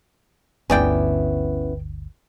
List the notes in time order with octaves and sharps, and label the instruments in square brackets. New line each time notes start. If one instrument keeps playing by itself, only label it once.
[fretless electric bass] G1 D2 [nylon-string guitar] B3 C#4 E4 [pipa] G#4 D5 G5